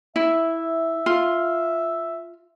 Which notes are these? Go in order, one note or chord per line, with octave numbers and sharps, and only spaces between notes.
E4 E5
F4